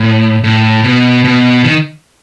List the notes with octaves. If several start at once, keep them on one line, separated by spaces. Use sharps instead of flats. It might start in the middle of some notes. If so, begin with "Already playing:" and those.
Already playing: A2
A2
B2
B2
D#3